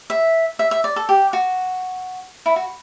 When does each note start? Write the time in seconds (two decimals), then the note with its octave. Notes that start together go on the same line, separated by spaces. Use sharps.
0.10 E5
0.59 E5
0.71 E5
0.84 D5
0.96 A4
1.09 G4
1.33 F#4
2.46 E4
2.56 F#4